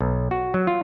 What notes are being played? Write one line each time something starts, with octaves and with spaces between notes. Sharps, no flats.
B1
F#4
F#3
F4